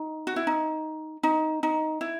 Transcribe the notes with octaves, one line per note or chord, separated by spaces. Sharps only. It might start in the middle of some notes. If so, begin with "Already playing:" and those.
Already playing: D#4
F#4
E4
D#4
D#4
D#4
E4